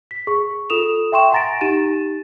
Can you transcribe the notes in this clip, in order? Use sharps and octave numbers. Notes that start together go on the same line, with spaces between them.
B6
G#4 C#6
F4 A4 D#6 E7 F7
E5 G5 C6 C#6 E7
F#5 G#5 A#5 A6 A#6 D7
D#4 G4 A6 D#7 E7